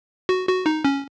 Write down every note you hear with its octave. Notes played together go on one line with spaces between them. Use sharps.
F#4
F#4
D#4
C#4